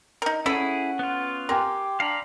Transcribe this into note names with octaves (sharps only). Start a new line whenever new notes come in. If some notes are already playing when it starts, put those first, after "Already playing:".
D#4 A#4
C#4 E4 G#4 A4 F#5 A5 B5
B3 F4
G4 A#4 G5 G#5 C6
D4 F5 A#5 B5